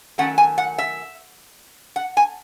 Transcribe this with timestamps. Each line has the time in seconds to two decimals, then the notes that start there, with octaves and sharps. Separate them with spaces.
0.18 D#3 F#3 A3 C#4 F#5
0.38 G#5
0.58 F#5
0.78 E5
1.96 F#5
2.17 G#5